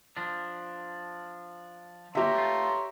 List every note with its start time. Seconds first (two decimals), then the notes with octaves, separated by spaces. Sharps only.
0.17 F3 D4
2.15 D3 A#3 G4 C#5 E5 A#5 C6
2.35 A3 F4